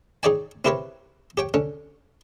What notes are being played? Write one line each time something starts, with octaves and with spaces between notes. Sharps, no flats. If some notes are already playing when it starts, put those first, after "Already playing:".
D#4 G#4 C#5 D5 G5 G#5
C4 E4 G4 A#4 B4 C#5
G4 C#5 G5
D3 C#4